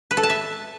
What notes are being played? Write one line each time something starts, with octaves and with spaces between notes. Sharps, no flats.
B4
A4
A5
E5